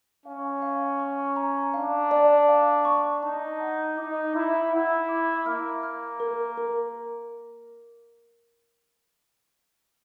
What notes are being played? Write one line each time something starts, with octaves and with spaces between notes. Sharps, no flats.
C#4 F5
F5
C#6
A#5
D4 F5
D5
F5
C#6
D#4 A5
F#5
D#4 D6
E4 D6
E4 F#5
D6
A#3 F6
F6
A#4
A#4